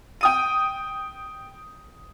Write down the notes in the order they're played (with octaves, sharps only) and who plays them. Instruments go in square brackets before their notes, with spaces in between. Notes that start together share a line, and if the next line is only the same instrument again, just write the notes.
[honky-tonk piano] G5 D#6 D#7